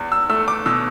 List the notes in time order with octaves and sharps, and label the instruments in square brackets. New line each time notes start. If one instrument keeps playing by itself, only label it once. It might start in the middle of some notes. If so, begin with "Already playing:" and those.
Already playing: [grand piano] E2
E6
A3 E6
D6
B2 E6